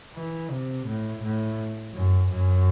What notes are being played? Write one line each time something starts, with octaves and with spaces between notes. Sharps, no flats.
E3
C3
A2
A2
F#2
F#2